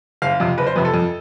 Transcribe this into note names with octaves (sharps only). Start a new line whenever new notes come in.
F#1 F5
F2 C3
F#1 B4
C5
F2 C3 B4
A4
F2